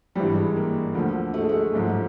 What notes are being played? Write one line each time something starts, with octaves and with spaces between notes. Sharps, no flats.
G#1 G2 E3 G3
G#3
A#3
D2 D3 F3
A3
G#3
A3
A1 G#2 F3